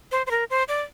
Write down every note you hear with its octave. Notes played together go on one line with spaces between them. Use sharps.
C5
C5
A#4
C5
D5